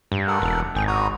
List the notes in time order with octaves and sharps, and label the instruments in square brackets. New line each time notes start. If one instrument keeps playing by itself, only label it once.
[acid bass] G2
[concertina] A4 A#4 F#5
[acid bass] E1
[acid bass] G#1 [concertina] G#4 G5
[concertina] F#4 A#5 D#6